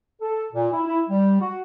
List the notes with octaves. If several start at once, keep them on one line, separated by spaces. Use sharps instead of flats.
A4
A#2
E4
E4
G3
F#4